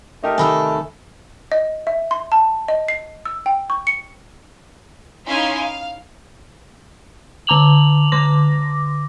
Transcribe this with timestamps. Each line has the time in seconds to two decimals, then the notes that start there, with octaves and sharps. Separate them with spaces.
0.24 A3 D#4 G4 A#4
0.38 C3 D#3 A4 G#5 B5 E6
1.52 D#5
1.87 E5
2.11 C6
2.32 A5
2.68 D#5
2.88 C7
3.25 E6
3.46 G5
3.70 C#6
3.87 C#7
5.27 C#4 D#4 E4 F5 G#5 C6
5.58 F5
7.47 D3 A5 A#5 D6 F7 F#7
8.12 D3 C6 D6 A#6